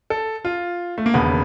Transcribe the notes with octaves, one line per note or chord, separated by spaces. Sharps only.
A4
F4
A3
A#3
E1 D#2 C#3 B3